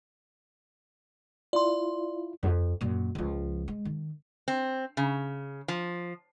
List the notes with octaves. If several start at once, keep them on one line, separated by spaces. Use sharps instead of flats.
E4 F4 D5 C6
F2
F#2 A#2
C#2 F3
G#3
D#3
C4
C#3
F3